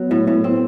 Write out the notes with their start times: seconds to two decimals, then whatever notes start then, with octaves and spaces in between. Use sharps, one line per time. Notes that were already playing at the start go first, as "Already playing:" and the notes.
Already playing: F#3 B3
0.11 A2
0.27 A2
0.44 C4